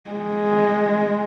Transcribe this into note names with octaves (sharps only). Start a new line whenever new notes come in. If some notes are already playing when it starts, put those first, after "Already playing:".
G#3